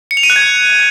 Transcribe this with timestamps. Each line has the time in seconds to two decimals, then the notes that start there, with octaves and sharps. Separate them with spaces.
0.11 C#7
0.17 F7
0.23 D#7
0.30 F#6
0.36 G#6